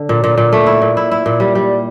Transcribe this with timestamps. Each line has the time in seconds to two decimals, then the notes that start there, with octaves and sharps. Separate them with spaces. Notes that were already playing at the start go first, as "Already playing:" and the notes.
Already playing: D3
0.09 A#2
0.24 A#2
0.38 A#2
0.53 A3
0.66 E4
0.82 A#2
0.97 E4
1.11 E4
1.26 A#2
1.40 G3
1.55 G3